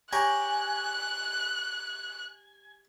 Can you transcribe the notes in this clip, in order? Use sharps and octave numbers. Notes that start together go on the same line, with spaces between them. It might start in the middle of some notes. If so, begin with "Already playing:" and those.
G4 C#5 G#5 A#5 F#6